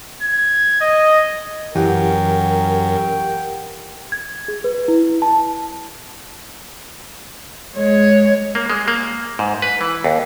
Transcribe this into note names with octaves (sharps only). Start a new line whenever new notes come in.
G#6
D#5
F#2 E3 G4 A#4 F#5 G5
G#6
G#4
B4
E4
A5
G#3 C#5
A#3
G#3
A#3
G#2
B4
E3
D#2